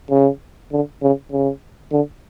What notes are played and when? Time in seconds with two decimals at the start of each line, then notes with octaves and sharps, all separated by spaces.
0.10 C#3
0.72 D3
1.02 C#3
1.31 C#3
1.92 D3